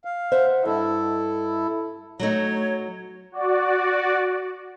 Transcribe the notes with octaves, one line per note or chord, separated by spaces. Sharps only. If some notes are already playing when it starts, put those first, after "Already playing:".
F5
C5 E5 F#5
G2 E4 A4 D#5
F#3 A3 D#4 C#5
F#4 D5